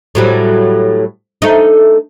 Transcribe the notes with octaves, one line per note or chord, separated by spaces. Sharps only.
A2 F#3 G3
A3 D#4